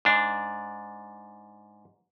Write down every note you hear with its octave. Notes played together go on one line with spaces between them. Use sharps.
G#2 D4